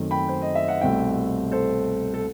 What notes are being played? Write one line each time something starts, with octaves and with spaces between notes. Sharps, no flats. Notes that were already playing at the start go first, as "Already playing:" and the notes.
Already playing: F#2 D#3 A3 C4
G5 B5
C5
D#5
E5
F#5
C2 B2 A3 C4 E5 G5
A4 C5
A4